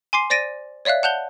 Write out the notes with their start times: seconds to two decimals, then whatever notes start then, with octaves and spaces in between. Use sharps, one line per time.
0.13 G#5 C6 D6 C7
0.30 C5 D5 A6 A#6 D7 D#7
0.85 C#5 D5 E5 F5 F#6
1.03 F#5 A5 F#6 G6 F7 G7